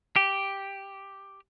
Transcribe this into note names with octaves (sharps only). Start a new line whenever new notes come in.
G4